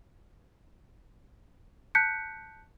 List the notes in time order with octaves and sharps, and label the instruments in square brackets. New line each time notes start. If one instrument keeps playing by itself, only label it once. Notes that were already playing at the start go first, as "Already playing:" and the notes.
[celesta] A5 F#6 G6 B6 C#7